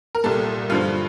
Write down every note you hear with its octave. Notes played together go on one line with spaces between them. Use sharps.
A#4
C2 A#2 G3 A4
G2 D3 F3 F4